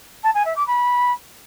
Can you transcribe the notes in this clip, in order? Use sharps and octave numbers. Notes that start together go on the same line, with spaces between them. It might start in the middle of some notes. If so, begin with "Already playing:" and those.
A5
G#5
E5
D6
B5